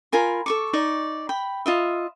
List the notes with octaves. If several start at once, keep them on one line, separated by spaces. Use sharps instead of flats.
F4 A#4 G#5 B5
A4 C#6 D6
D#4 D5 C#6
G5 B5
F4 D#5 E5